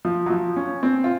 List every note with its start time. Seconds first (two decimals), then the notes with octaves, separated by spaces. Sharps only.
0.05 F3
0.26 F#3
0.30 F3
0.56 C#4
0.83 C4
1.04 F4